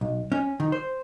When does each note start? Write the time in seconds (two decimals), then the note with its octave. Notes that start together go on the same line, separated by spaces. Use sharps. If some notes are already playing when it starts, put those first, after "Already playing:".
0.01 B1
0.32 C#4
0.60 D#3
0.72 C5